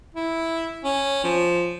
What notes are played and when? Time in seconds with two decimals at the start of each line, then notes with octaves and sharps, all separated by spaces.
0.14 E4
0.84 C#4
1.24 F3